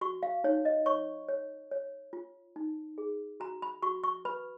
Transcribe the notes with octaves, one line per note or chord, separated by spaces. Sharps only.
F#4 C#6
F5
D#4 C#5
D#5
C#5 C#6
C#5
C#5
F4
D#4
G#4
F#4 A#5
B5
F#4 C#6
C#6
B4 B5